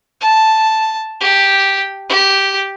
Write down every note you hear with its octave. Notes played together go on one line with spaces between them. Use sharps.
A5
G4
G4